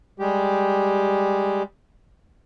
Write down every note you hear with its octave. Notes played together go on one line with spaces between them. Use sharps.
G3 G#3 G4